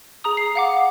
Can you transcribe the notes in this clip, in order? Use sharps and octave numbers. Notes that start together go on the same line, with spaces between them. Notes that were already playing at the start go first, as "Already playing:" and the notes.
G#4 A#5 D#6
C7
F5 F#5 D6